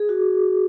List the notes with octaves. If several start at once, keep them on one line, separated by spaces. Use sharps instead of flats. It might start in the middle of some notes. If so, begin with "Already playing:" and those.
Already playing: G#4
F#4